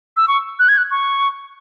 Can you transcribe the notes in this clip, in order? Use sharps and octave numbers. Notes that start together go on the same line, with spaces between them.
E6
C#6
F#6
G#6
F#6
C#6